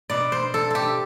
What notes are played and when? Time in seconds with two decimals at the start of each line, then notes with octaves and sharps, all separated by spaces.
0.09 B2 D5
0.32 C5
0.54 A4
0.70 G4 A4